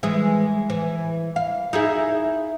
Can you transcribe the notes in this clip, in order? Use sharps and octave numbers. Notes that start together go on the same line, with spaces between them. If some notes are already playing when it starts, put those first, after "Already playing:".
E3 G#3 G#4
E3
F5
D#4 E4 G#4